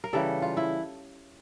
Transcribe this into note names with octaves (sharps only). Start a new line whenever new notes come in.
A#4
C#3 E3 G3 A4
F4
E4